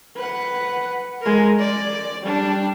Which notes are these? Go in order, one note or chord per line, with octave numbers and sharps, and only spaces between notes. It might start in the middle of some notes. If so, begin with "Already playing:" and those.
B4 F#5
G#3 A#4
D5
G3 D4